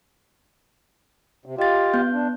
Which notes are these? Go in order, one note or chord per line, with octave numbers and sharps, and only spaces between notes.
C3
F4 G4 D#5 A6
B3 G6
D4